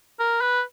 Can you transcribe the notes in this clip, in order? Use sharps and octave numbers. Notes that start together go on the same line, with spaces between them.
A#4
B4